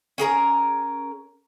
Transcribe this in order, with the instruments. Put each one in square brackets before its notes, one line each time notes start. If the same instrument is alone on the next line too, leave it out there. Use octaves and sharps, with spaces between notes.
[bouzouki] C#4 G#4 A#4 A#5